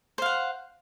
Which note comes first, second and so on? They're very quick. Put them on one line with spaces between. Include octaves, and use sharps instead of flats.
C5 F5 F#5